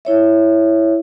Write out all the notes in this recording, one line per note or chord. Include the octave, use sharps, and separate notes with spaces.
E4 C#5 E5